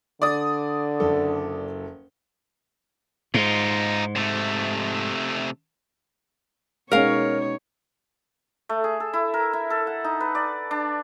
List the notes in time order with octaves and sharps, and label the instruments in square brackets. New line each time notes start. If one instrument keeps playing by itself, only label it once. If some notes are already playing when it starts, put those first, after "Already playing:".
[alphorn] D3 [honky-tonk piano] D5 D#6
[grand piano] F#1 A4
[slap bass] G#2 [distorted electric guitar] D#4 F4
[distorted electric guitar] C3 A3
[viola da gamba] B2 D#4 C#5 [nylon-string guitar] G#3 C#4 [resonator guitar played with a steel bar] A#4 F5
[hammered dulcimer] A3
G#4
A4
E4
A#4
E4
A4
F#5
D#4
B4
D5
D4